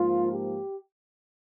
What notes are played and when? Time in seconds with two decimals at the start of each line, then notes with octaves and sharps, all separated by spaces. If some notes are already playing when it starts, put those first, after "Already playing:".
Already playing: G#2 F3 A#3 F4
0.32 G4